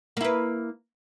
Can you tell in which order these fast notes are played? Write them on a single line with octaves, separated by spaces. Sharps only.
A#3 E4 B4